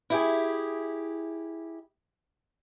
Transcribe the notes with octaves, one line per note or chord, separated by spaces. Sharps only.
E4 G4 G#4